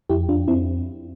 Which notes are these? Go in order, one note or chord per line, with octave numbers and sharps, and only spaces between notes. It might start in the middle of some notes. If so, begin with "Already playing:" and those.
F2 E4 G4
F2 D4 F4
F2 C4 E4